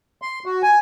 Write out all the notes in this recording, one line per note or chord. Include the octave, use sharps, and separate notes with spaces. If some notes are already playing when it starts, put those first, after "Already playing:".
C6
F#4
G#5